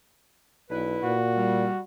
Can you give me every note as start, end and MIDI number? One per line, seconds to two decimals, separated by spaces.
0.70 0.98 35
0.70 1.14 62
0.70 1.14 64
0.70 1.14 71
1.03 1.68 46
1.03 1.82 66
1.37 1.78 55